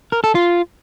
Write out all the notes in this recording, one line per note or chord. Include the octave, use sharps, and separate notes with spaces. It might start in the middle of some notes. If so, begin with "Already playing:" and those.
A#4
A4
F4